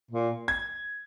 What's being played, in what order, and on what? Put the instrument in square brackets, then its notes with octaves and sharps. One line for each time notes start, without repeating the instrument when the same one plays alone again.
[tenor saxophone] A#2
[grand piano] G#6